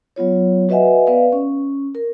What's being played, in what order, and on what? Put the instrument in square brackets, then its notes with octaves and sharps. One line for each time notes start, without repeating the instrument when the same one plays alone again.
[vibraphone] F#3 B3 F4 C#5
F#4 B4 D#5 E5 F#5 G#5
B3 B4 D5 F5
C#4
A#4